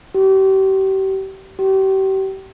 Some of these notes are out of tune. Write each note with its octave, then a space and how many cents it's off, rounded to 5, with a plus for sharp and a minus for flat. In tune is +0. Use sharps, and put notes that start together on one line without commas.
G4 -35
G4 -35